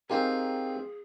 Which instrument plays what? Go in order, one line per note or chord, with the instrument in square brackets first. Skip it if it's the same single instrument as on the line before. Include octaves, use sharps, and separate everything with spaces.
[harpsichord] C4 F4 G#5 [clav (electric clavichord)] D#4 G4 A#4 [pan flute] G#4